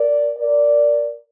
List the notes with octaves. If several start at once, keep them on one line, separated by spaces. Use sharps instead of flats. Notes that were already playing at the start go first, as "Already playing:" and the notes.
Already playing: A#4 D5
A#4 D5